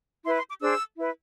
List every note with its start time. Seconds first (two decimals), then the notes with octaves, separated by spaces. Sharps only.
0.25 E4 B4 C6
0.36 C6
0.49 D6
0.61 D4 G#4 C5 E6
0.96 E4 B4